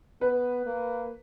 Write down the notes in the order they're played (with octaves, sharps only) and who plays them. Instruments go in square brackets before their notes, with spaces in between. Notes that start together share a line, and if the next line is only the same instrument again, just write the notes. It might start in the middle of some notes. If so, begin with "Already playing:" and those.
[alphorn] B3 [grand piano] B4
[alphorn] A#3